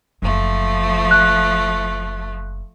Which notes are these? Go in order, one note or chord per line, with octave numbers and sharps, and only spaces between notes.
F#1 F3 A3
F#6